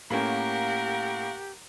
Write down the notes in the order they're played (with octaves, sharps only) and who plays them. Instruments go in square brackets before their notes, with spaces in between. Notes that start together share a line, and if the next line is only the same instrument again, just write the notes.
[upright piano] A2 A#3 C#4 [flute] G4 [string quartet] A#4 F#5 [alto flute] F5